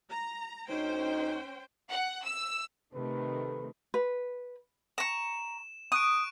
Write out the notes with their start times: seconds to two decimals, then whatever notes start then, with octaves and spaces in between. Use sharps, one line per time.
0.10 A#5
0.69 D2 C#4 D#4 C5 G5
1.89 F#5
2.24 E6
2.94 C3 D#3 A3 B4
3.94 B4
4.98 A#5 C#6 E7
5.92 C#6 D#6 F#6 D7